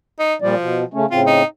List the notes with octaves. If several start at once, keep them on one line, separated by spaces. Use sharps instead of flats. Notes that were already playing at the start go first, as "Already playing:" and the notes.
D#4
A#2 F3 G3 D5
B2
C#3 A3 C#4
A2 C#3 C4 F4
D#4